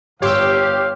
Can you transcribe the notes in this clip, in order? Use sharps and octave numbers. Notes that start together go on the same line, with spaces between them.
G1 G4 C#5 F5 C6 E6